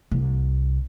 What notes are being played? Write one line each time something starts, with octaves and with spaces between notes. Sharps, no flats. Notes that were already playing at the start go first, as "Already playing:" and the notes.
C2